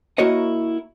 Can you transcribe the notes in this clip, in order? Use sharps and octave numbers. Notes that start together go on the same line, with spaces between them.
A#3 E4 F#4 A#4 C#5 D#5